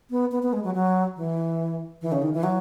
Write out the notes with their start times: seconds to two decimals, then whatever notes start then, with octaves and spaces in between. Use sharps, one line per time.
0.11 B3
0.32 B3
0.43 B3
0.53 G#3
0.64 F#3
0.74 F#3
1.17 E3
2.02 E3
2.12 C#3
2.22 D#3
2.33 E3
2.43 F#3